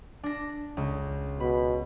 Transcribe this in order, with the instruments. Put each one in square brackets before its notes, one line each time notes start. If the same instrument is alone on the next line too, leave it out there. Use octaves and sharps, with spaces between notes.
[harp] D4 A#6
C#2
[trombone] B2 [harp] B5